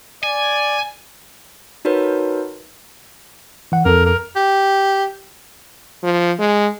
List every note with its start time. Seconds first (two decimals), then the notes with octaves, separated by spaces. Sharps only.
0.23 D5 G#5
1.85 D#4 F#4 A#4 B4 C#5
3.72 E3 F#5
3.86 F2 A4 A#4
4.05 A#4
4.36 G4
6.03 F3
6.39 G#3